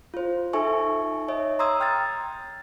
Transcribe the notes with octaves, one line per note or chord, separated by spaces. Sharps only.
F4 C5
D#4 A4 E5 G#5 C#6
C#5 D#5 E5
A#5 C6 D#6 E6 G#6
G5 F6 G#6 A6